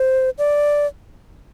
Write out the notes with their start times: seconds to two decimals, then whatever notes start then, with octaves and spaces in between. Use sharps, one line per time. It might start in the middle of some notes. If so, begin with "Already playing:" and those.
Already playing: C5
0.38 D5